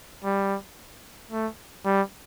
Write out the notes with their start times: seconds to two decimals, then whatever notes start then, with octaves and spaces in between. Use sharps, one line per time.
0.24 G3
1.31 A3
1.85 G3